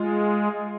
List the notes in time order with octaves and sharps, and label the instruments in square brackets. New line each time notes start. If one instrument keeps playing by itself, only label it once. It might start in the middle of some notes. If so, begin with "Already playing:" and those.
Already playing: [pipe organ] G#3 [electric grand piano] F4